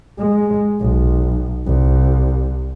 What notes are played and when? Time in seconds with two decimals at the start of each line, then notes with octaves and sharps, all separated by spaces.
0.19 G#3
0.80 B1
1.65 C2